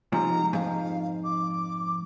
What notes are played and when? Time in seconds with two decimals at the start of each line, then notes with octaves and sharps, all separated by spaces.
0.12 G#2 C3 F3 A#5
0.53 F2 G#2 F5
1.24 D6